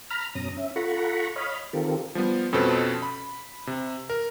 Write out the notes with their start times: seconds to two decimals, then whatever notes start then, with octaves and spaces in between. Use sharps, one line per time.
0.10 A#5 B5 F6
0.35 F#2 B2 C#4 A#5 D#6
0.57 C#4 E5
0.76 F4 A4 F#5 A#5 B5 C#6
1.36 C#5 D#5 F5 B5
1.73 D#3 C4 F4 G4 A4 A#4
2.15 F3 G3 B3
2.53 F2 B2 C#4 A4 B4 C5
3.02 B5
3.67 C3
4.10 A#4